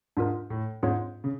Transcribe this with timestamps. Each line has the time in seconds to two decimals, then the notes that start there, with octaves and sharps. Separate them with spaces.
0.17 G#2 D4 F4 A#4
0.50 A2
0.83 G#2 C4 F4 G#4 C#5
1.24 C#3